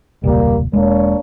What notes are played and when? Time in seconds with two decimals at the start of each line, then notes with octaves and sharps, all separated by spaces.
0.24 E1 C#2 A#2 G3 A#3
0.73 E1 G#3 A#3 D4 C#5